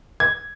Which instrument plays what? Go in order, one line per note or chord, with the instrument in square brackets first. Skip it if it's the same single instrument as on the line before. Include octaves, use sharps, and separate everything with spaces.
[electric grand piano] G#6